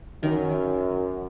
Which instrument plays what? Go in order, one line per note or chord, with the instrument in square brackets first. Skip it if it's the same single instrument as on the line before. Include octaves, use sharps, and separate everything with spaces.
[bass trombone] F#2 [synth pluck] D#3